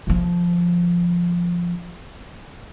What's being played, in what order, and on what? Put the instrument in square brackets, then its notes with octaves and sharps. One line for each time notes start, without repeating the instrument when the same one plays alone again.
[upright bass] D3 F3